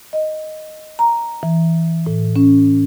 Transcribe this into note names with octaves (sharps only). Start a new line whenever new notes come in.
D#5
A#5
E3
A2
C#4